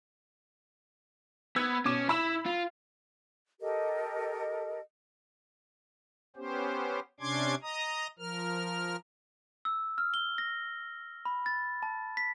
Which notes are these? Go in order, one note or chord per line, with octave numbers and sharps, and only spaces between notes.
B3 E6 G#6
B2 C#4 D6 E7
E4 B5 E6 E7
F4
G4 A4 A#4 D#5
B3 C#4 G4 C5
C3 C#4 D4 C6 D6 G#6
D#5 A#5 D#6
F3 A#4 F6
E6
F6
G7
A#6
B5
A6
A5
B6